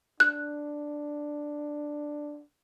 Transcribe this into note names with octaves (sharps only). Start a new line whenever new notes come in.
D4 F#6